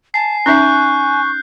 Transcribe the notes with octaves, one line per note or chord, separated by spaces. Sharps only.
G#5 A5 C7
C#4 D#4 E5 C#6 F#6 G6 C7